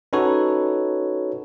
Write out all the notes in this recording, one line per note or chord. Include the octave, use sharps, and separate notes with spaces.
C#4 D#4 F#4 A4 B4 C#5